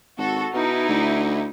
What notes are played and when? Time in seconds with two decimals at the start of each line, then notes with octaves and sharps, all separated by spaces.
0.18 G#1 F#4 A4
0.53 B2 D#4 E4
0.89 D2